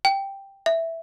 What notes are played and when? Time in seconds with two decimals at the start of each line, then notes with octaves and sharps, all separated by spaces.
0.05 G5
0.66 E5